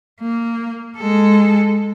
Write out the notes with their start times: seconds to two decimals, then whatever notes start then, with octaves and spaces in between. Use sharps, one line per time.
0.21 A#3
0.98 G#3 A4